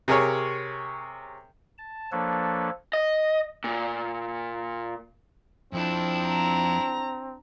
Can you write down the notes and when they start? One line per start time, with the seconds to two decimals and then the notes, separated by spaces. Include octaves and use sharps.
0.08 C3 G#4 A#4 C#5
1.78 A5
2.12 F3 A#3 D4 A4 B4 C#5
2.93 D#5
3.64 A#2
5.73 F2 F3 C4 D4 E4
6.28 A#5